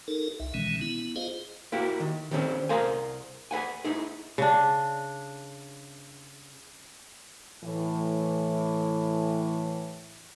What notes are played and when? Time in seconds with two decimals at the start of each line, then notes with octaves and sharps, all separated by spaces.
0.08 D#4 A4 A#4
0.40 C2 E5
0.54 B2 D#3 E3 G#3 C#4
0.81 B3 E4
1.16 F4 G#4 C5 D#5 F5
1.72 A#3 E4 F#4 G4
2.00 D#3
2.31 D#3 G3 A#3 C4 C#4
2.69 C2 G#4 A#4 C5 F5 G#5
3.51 G#4 B4 F#5 G#5
3.85 D#4 E4 G#4
4.38 C#3 D4
7.64 A2 E3